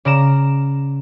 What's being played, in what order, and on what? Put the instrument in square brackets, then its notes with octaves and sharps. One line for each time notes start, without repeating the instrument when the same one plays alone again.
[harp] C#3 D5 A#5 E7